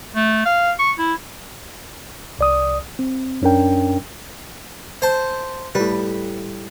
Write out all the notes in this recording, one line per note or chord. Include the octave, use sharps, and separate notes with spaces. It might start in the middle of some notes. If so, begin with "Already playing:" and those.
A3
F5
C#6
E4
C2 D5 D#6
C4
F#2 C#4 D4 A#4 G5
C5 A5
A2 G3 B4